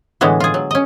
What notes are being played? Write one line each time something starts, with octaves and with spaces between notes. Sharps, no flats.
A2 D3 E3 G#3 B3 F#4
F4 G#4
F#3
C#4 D#5